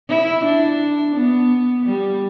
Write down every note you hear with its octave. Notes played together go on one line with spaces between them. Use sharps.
E4
D4
B3
G3